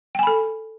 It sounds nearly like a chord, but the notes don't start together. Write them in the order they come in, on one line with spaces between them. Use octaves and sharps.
G5 G#5 B5 A4